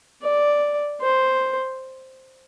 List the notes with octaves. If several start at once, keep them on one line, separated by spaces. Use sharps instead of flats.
D5
C5